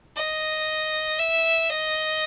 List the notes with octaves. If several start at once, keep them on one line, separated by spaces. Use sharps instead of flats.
D#5
E5
D#5